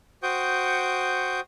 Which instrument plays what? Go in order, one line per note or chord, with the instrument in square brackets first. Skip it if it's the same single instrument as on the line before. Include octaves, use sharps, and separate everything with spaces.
[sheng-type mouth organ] F#4 C5 G5 C#6 D#6 G6